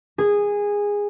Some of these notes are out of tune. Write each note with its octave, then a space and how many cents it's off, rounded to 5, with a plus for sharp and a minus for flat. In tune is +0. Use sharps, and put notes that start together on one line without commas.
G#4 -15